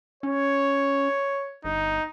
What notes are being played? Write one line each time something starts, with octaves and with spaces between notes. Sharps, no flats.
C#4 C#5
G1 D#4